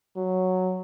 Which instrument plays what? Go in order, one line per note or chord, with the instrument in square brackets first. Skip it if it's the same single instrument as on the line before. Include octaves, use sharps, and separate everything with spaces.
[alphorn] F#3